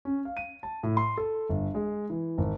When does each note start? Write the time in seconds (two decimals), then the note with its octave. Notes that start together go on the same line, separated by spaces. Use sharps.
0.05 C#4
0.25 F5
0.37 D#7
0.63 A5
0.83 A2
0.97 C6
1.17 A4
1.49 G1
1.75 G#3
2.10 E3
2.38 G#1